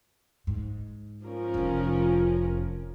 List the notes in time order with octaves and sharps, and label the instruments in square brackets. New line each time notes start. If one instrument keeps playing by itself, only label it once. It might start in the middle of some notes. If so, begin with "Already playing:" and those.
[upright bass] G#2
[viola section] F3 C#4 A#4
[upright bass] F1 D#4